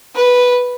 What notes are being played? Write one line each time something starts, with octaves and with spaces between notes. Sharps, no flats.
B4